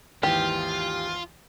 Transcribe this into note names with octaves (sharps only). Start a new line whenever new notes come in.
G#1 D#2 E3 F4 G4